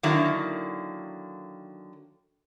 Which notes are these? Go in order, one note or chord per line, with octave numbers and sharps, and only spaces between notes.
D3 D#3 F#3 A#3 E4